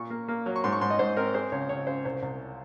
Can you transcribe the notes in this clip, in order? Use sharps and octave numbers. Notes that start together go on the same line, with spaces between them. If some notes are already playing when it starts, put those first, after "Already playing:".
Already playing: A#2 C#6
A#3
A#3
F#3
C#6
G#2 C6
C#6
G#2 C6
D#5
G#2 C5
C4 A#4
G#3 C5
C#2 C#5
C#2 C#5
C#3 C5
C2 C5
C2